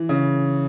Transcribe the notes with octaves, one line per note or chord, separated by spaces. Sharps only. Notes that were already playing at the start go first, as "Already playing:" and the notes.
Already playing: E3
C#3